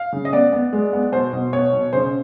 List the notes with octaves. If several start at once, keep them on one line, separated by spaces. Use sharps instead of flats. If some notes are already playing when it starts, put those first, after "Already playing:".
Already playing: F5
C#3
D#5
B3 D5
B3
G#3
B3
B2 C5
B2
B3 C#5
B2
C#3 C5